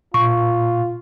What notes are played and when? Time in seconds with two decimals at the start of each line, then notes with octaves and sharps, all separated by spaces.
0.14 A#2 F4 C#6